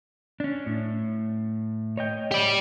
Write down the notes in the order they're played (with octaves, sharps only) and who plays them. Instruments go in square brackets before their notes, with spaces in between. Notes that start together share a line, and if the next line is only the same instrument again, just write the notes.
[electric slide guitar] C#4 D4
A2
C#5 D#5 G5
[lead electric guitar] G4 D5